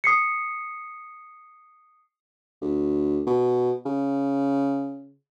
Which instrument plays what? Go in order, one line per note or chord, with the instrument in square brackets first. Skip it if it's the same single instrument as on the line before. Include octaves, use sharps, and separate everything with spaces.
[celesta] D#6 C7 C#7
[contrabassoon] D2
B2
C#3